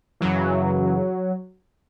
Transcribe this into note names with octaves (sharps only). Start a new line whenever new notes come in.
F#2 C#3 E3 F#3